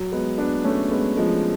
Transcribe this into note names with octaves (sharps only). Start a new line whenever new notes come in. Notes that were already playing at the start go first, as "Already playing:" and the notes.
Already playing: F#3
G#3 B3
B3 D4
A3 C#4
G#3 B3
F3 G#3